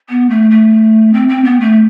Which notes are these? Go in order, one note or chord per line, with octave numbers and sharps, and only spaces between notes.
B3
A3
A3
C4
C4
B3
A3